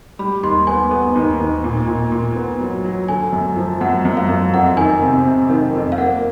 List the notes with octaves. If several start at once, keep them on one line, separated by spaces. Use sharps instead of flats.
G3 B5
D#2 C6
B3 G#5
B3
D#2
D#2
A#2
A#2
A#2
B3
F#3
F#3
D3 G#5
F#2
F3
F#2 F#5
F#2
F5
F#2
F2 F#5
D#3 G#5
C3
C3
D#3
F2
F5
A#3 F#5